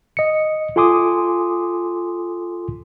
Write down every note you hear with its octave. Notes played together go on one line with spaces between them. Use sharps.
D#5 C#7
F4 A4 G#5 C6 D6 D#6